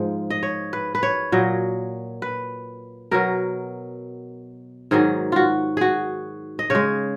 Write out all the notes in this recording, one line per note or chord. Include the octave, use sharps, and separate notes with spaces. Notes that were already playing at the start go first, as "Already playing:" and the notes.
Already playing: G#2 F3 G#3
D#5
C#5
B4
B4
C#5
A#2 F#3 D#5
B4
B2 F#3 A#4
G#2 D#3 F#3 G#4
F4 F#4
F#4 G#4
D#5
C#3 G#3 C#5